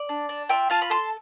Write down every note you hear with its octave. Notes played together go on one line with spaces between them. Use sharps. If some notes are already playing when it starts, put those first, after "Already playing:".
Already playing: D5
D4
D4
F4 E5 G5
F4 F5 A5
B5
A4 A5 C6